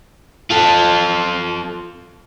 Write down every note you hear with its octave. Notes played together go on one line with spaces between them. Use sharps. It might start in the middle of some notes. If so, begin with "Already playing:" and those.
F4 A4